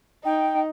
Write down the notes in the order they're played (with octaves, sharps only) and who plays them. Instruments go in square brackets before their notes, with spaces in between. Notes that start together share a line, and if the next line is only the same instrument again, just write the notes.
[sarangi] D#4 [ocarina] G5